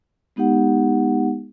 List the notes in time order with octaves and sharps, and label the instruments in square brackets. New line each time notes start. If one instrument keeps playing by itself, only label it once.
[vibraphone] G#3 B3 D#4 G4 F#5